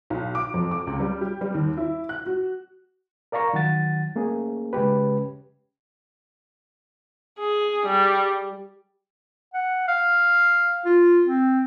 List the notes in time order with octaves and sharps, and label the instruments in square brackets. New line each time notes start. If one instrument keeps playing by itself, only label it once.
[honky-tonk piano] B1
D6
F2
D6
C#2
G3
G4
G3
D#2
E4
F#6
F#4
[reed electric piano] A#4 D5 F5 A#5 C#6
D#3 F#3 F#5 A6
A3 A#3 C#4 G#4
C#3 G#3 C#4 G4 B4
[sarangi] G#4
G3
[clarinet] F#5
F5
F4
C4